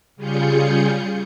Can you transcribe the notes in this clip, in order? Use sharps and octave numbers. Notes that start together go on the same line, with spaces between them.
C#3 G3 F4 G#4 G6 C#7